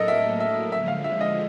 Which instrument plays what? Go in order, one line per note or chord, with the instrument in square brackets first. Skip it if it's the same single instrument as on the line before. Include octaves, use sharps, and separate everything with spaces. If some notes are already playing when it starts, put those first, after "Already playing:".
Already playing: [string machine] A2 F#3 A#3 [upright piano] A4 A#4 D#5
[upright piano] E5
E5
[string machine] D3 F3 G#3 [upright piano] E5
[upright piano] F5
E5
D#5